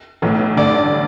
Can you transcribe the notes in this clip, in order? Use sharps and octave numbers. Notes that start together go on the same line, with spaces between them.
B1 A2 E3
A1 G2 D3 D5